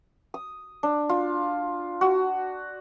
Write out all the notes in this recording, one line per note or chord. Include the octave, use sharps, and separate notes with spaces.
D#6
D4
F4
F#4